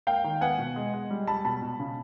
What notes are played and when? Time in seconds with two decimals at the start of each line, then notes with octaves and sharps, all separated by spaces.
0.07 A#3 F5 G5
0.24 D#3
0.41 B3 F#5 G#5
0.58 B2
0.76 G#3
0.94 G#3
1.10 G3
1.27 G3 A5 B5
1.45 B2 A5 B5
1.62 B2
1.79 C#3